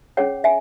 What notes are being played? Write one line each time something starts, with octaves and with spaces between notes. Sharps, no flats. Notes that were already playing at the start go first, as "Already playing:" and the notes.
C#4 G#4 C#5 F#5
E5 G#5